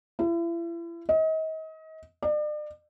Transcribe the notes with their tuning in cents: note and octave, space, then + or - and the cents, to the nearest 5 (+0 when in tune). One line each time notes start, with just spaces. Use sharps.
E4 +40
D#5 +35
D5 +40